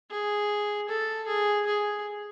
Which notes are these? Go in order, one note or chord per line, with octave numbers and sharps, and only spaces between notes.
G#4
A4
G#4
G#4